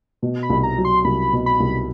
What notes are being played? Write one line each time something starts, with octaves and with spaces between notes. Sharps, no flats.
B2
B5
C2
A#5
F#3
C6
C2 B5
B2
B5
C2